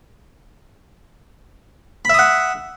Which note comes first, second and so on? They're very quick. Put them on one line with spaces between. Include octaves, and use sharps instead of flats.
B5 E5 D#6 F#5